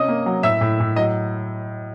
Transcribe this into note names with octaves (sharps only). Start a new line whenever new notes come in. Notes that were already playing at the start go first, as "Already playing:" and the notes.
Already playing: C3 C#4 D#5 D#6
A#3
F#3
A2 E5 E6
A2
A2
F#3 D#5